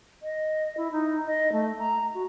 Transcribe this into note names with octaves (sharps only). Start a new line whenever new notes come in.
D#5
E4
D#4
D#5
A3
A#5
F#4